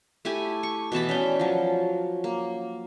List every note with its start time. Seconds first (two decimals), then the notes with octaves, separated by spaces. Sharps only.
0.25 A3 E4 G4 G#5
0.63 C#6
0.92 B2 E3 A5 B5
1.09 C#4 D5 G5
1.39 F3 F#3
2.24 A#3